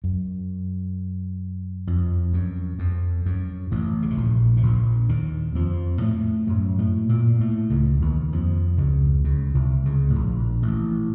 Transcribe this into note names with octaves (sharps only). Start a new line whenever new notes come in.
F#2
F2
F#2
F2
F#2
A1 A2
C#3
C3
A#1 A#2
C3
A#1 A#2
D#2 D#3
F2 F3
A2 A3
F#2 F#3
A2 A3
A#2 A#3
A2 A3
C#2 C#3
D#2 D#3
F2 F3
C#2 C#3
C#2 C#3
C2 C3
C#2 C#3
A2
A#1 A#2
A1 A2